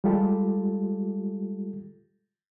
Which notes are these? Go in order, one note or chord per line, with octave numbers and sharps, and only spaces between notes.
G3 G#3 F4 G4 A4